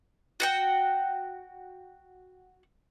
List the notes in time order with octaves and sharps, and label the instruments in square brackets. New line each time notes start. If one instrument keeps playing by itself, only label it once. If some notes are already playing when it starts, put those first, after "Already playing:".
[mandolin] F#4 F#5 G5